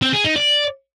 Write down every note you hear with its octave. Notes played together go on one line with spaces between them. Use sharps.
C4
G#4
D#4
D5